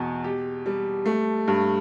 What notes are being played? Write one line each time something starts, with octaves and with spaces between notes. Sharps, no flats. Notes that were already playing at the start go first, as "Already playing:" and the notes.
Already playing: E2 B2
G4
G3
A3
G2